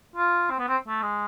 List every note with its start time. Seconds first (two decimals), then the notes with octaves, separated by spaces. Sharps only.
0.16 F4
0.50 C4
0.59 B3
0.68 C4
0.88 A3
1.02 G#3